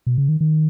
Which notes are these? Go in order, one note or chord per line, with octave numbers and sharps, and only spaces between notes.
B2
C#3
D#3
D#3